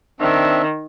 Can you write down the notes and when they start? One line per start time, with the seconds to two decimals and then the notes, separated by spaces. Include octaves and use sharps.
0.20 D#3 C4 D4 E5